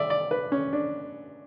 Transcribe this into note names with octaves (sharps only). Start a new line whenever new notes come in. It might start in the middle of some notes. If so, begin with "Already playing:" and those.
Already playing: D5 E5
D5
B4
C#4
D4